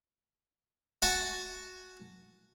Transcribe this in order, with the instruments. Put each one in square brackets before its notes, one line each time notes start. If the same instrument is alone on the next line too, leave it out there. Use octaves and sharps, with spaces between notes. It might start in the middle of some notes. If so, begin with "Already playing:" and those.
[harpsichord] F#4 F#5 G#5 A5 C#6